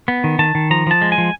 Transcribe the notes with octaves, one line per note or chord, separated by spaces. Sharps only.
B3
D#3
D#3 A5
D#3
F3 A#5
F3 A5
G#3
G#5
F3